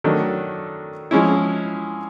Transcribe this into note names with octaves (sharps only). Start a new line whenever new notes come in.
D#3 F#3 A3 D4
F3 G#3 C#4 E4